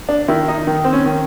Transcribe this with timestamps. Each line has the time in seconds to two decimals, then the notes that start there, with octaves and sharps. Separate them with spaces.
0.09 D4
0.28 D#3 E4
0.48 D#4
0.67 D#3
0.84 C4
0.93 C#4
1.06 D#3